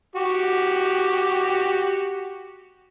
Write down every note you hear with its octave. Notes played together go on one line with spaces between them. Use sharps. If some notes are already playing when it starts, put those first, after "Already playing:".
F#4 G4